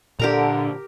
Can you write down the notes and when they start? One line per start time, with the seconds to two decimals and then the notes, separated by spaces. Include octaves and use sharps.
0.19 A#2 D3 D4 G4 A#4 A#5